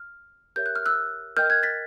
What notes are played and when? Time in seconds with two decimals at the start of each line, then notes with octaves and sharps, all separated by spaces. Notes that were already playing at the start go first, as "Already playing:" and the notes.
Already playing: F6
0.56 G4 A#4 C#5 E5 G6
0.66 F#6
0.76 F6
0.86 E6 F#6
1.37 A#4 D#5 G5 F6 G6
1.50 F#6 G#6
1.63 A6 B6